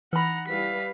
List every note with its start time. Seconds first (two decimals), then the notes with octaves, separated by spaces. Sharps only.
0.13 E3 D#4 F#5 A#5 B5 F6
0.48 G3 E4 B4 F5 B6